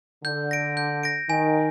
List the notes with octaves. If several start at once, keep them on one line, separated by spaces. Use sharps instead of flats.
D3 G6
A#6 D7
G6
A#6 D7
D#3 G#5